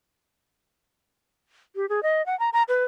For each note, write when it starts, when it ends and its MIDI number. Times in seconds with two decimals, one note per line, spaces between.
1.76 1.88 67
1.89 2.03 68
2.03 2.25 75
2.26 2.38 78
2.39 2.50 82
2.53 2.63 82
2.68 2.85 71